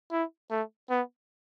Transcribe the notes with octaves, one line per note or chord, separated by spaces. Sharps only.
E4
A3
B3